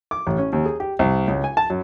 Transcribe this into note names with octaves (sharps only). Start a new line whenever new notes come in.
D6
A1
C#4
D#2
G#4
G4
C2
C#2
G#5
A5
F#2